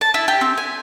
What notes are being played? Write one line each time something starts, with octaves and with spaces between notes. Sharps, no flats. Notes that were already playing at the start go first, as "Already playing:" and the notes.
A5
E4
G4
C4
G#5